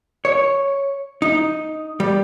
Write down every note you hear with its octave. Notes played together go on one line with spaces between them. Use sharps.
C#5
D#4
G3